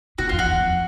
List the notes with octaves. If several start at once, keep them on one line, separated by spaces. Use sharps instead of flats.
B2 F#4
F2 F4
F#4
E2
F2